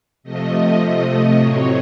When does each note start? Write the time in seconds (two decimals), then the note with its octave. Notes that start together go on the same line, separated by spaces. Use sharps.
0.23 C3 F3 A3 D#5
1.38 A2 F#3 C4 C#5